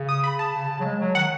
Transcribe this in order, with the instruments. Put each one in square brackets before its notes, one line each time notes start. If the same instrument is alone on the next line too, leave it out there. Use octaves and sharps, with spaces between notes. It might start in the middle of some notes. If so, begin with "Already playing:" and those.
Already playing: [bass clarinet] C#3
[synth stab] D#6
B5
A5
[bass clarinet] C#3
C#3
F#3
G#3
F#3
[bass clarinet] D#3 [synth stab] F#5